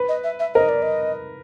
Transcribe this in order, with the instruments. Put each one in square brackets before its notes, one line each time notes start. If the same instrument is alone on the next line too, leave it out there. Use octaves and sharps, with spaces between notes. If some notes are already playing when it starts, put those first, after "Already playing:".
Already playing: [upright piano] B4
[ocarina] D#5
E5
E5
[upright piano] A#4 [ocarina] D#5
[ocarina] D5
D#5